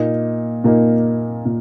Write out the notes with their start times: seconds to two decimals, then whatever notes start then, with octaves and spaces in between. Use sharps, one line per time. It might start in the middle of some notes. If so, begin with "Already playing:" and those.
Already playing: A#2 A#3 D#4
0.64 A#2 A#3 D#4
1.45 A#2